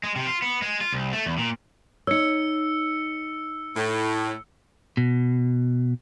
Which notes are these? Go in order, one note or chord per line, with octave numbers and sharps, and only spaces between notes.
G#3
C3
F4
B3
G#3
F4
C2
A3
E2
A#2
D#4 C#5 E6 C#7
A2
B2